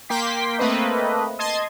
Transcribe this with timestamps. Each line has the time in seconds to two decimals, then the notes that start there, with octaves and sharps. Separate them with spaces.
0.09 A#3 G5 C6 D6 B6
0.59 A3 A#3 C4 B4 D#5
1.39 D#5 A5 C6 G#6